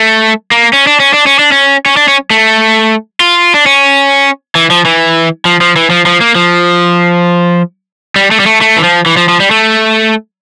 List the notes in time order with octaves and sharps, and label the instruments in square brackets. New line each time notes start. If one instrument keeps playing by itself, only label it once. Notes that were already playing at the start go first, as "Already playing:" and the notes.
Already playing: [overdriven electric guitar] A3
A#3
C#4
D4
C#4
D4
C#4
D4
C#4
C#4
D4
C#4
A3
F4
D4
C#4
E3
F3
E3
F3
F3
E3
F3
F3
A#3
F3
G3
A3
G3
A3
A3
E3
F3
E3
F3
F3
G3
A3